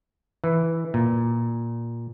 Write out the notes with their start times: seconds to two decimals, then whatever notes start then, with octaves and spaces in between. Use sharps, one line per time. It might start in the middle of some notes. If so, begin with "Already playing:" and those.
0.44 E3
0.94 A#2